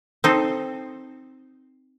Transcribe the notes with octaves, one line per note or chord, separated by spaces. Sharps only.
C4 D#4 A4